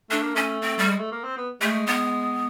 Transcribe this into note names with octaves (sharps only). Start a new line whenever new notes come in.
A3 D4
A#3
A3 C#4
C4
G3
G#3
A3
A#3
C4
B3
G#3 A3
B3